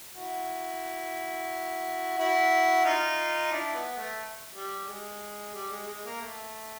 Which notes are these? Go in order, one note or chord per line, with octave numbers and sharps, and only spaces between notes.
E4 F#4
E4 F#4
D#4 F4
D4 E4
B3
A3
G3
G#3
G3
G#3
G#3
A#3
A3